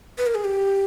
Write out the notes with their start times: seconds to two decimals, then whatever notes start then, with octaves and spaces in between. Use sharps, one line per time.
0.18 B4
0.27 A#4
0.35 G#4
0.44 G4